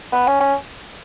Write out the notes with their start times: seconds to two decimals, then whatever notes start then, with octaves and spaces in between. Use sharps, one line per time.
0.13 B3
0.27 C#4
0.41 C#4